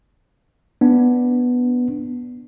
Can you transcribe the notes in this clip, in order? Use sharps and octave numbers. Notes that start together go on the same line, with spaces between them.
B3 D4